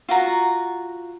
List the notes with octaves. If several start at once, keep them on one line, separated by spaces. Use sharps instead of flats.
F4 F#4 A#5